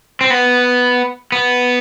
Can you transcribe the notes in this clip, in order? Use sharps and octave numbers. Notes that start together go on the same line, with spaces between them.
C4
B3
B3